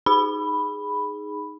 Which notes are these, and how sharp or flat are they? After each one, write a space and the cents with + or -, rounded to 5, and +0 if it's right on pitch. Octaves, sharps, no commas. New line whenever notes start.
D#4 +0 G#4 +0 B5 +0